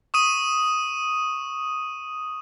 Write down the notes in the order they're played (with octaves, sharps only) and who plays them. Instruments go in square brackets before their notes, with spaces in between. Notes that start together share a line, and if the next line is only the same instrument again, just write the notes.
[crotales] C#6 D#6 D#7